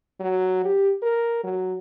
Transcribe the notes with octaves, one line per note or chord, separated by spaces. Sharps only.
F#3
G4
A#4
F#3